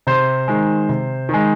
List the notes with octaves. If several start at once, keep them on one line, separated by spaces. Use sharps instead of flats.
C3 C5
D#3 G#3
C3
D#3 G#3